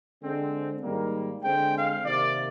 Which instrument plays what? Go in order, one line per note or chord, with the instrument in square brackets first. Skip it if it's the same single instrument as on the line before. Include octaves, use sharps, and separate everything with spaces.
[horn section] D3 G#3 C4
G#2 D#3 G3 A#3
D3 G#3 C4 G5
F5
C3 D#3 A#3 D5